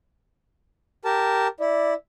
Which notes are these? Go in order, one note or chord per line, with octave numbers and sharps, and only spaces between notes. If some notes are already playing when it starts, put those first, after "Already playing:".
G4 A#4 A5
E4 D5